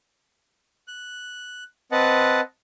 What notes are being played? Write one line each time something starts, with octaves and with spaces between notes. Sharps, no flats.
F#6
C4 B4 D#5 F#5 A5